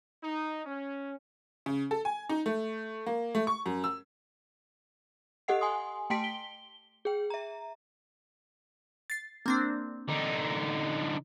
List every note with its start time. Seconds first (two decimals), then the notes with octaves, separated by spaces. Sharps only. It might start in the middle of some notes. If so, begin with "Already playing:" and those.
0.23 D#4
0.66 C#4
1.66 C#3
1.91 A4
2.05 G#5
2.29 D#4
2.46 A3
3.06 A#3
3.35 A3
3.47 C#6
3.66 F#2
3.84 E6
5.48 G4 A4 D#5 F#5 C7
5.61 G#5 C6 D#6
6.10 A3 G5 A5 C6 B6 D7
6.24 G7
7.05 G#4 G5
7.30 E5 A#5
9.10 A6 C7
9.46 A#3 C4 D4
10.09 D3 D#4